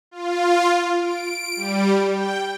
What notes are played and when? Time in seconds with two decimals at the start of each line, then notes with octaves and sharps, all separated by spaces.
0.11 F4
1.01 D7
1.56 G3
2.10 G5